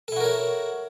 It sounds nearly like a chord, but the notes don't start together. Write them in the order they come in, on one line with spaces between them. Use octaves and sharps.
A4 E4 F#4 A#4 C#5